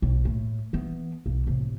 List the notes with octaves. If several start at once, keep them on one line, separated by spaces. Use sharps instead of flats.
B1
A2
E3 B3
B1
A1 C3